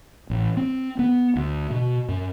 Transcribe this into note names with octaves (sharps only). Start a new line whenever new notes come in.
A1
C4
B3
D2
B2
F#2